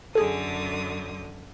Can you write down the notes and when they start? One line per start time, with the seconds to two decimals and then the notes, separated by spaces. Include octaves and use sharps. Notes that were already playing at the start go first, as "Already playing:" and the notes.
0.15 F#2 D3 G#4 A4 D#6